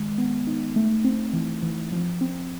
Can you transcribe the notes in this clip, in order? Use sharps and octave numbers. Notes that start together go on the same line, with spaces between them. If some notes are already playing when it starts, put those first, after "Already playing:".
Already playing: D#3 G#3
B3
D#4
A3
C4
E3
E3
F3
C4